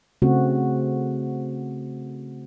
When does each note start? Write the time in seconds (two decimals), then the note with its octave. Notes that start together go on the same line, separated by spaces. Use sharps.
0.22 C#3 A3 C4 F#4